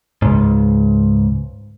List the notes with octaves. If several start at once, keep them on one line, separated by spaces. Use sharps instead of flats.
C#2 G#2